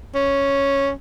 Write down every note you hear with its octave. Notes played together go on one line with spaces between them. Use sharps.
C#4